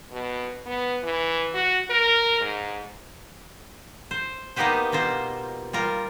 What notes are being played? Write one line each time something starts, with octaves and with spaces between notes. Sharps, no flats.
B2
B3
E3
F#4
A#4
G#2
C5
A#3 B3 D#4 G4 B4 C5
B2 A#3 F4 C5
G3 F4 A#4